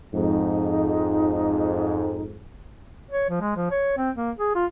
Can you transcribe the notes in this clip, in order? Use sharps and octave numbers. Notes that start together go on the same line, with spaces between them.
F2 G#2 D#4
C#5
F3
G#3
F3
C#5
C4
A#3
G#4
F4